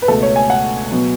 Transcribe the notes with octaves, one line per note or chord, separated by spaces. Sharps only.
B4
C#2 B2 A3 A4
C#5
G#5
F#5
B2 F#3 B3